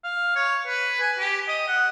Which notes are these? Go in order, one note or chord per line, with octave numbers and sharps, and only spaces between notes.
F5
C#5
B4
G#5
G4
D#5
F#5